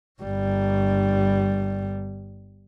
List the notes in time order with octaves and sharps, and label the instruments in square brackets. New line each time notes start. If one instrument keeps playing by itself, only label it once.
[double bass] G1 G3